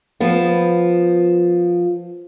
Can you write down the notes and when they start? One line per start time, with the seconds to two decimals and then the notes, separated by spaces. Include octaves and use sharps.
0.20 F3 B3